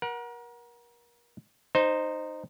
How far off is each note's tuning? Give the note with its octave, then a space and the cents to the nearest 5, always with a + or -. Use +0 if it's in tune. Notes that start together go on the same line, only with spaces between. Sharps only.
A#4 +35 F#5 +0
D#4 -15 C5 +0